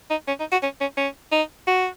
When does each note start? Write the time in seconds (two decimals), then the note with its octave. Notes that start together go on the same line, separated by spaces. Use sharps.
0.10 D#4
0.28 C#4
0.40 D#4
0.52 F#4
0.63 C#4
0.81 C#4
0.97 C#4
1.32 D#4
1.67 F#4